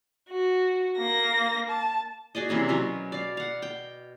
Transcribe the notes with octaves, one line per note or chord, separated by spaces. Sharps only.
F#4
A#3 A#6
A5
F#4 G#4 D5 D#5
C3 E3 A#3 C#4
B2 F#3 A#4 B4
D5 F5
F5 F#5
G5